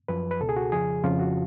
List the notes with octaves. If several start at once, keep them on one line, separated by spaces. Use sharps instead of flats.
F#2 F3 B4
B4
C#2 B2 A4
G#4
F#4
F2 C#3 F3 G#4
F2 C#3 F3 F4
F#4